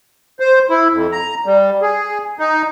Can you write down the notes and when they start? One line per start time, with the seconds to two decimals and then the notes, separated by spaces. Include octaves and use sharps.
0.40 C5
0.70 E4
0.93 F2
1.12 A#5
1.46 G3
1.82 G#4
2.39 D#4